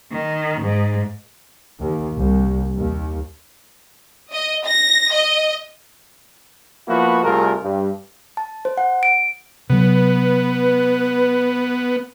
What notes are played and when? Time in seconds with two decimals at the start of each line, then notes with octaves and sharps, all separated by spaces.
0.12 D#3
0.61 G#2
1.81 D#2
2.18 C2
2.76 D#2
4.33 D#5
4.66 A#6
5.13 D#5
6.88 F3 A#3 B3 E4 F#4
7.24 C2 A3 F4 G#4 A#4
7.63 G2
8.37 A5
8.65 C5
8.77 F#5
9.03 D7
9.70 C3 F#3 B3 B4